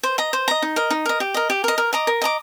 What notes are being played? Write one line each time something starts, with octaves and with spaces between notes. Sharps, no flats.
C5
D#5 A#5
C5
D#5 A#5
D#4
A#4 D#5
D#4
A#4 D#5
G4
A#4 D#5
G4
A#4 D#5
A#4
D#5 A#5 D6
A#4
D#5 A#5 D6